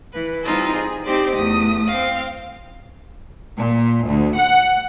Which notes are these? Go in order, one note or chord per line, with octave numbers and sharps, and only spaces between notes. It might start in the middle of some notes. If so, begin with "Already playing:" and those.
E3 B4
E3 G3 C4 D#4 F4 A4
G#4
C4 D#4 G4 C5 D5
E2 A3 D#6
C4 F5
A#2
D2
F#5